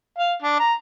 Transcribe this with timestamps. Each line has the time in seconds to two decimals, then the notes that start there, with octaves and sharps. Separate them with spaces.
0.18 F5
0.42 D4
0.59 A#5